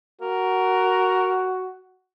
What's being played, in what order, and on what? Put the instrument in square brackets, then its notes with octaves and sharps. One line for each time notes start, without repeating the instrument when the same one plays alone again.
[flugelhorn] F#4 [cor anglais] A#4